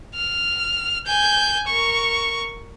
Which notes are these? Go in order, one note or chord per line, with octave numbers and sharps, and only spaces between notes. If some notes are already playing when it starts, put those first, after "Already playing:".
F6
G#5 G6
A#4 C#6